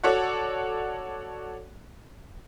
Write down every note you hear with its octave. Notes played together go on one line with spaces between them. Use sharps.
F#4 A4 C#5 D5 F#5